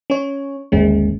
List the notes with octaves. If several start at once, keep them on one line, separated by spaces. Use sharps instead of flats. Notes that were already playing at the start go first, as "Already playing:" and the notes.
C#4 C#5
G1 D#2 G#3 C#4